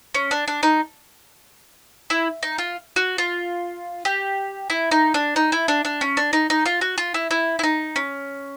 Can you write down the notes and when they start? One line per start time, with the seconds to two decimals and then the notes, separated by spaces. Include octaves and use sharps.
0.15 C#4
0.31 D4
0.48 D4
0.63 D#4
2.10 E4
2.43 D#4
2.58 F4
2.96 F#4
3.18 F4
4.05 G4
4.70 E4
4.91 D#4
5.14 D4
5.36 D#4
5.52 E4
5.68 D4
5.85 D4
6.01 C#4
6.17 D4
6.33 D#4
6.50 D#4
6.66 F4
6.81 F#4
6.98 F4
7.14 E4
7.31 E4
7.59 E4
7.63 D#4
7.96 C#4